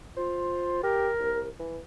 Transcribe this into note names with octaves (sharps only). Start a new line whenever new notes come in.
F4 C5
G4 A#4
C2
E3